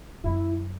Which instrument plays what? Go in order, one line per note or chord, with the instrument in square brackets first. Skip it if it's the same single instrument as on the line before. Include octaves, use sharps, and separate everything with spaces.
[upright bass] F#2 [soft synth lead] E4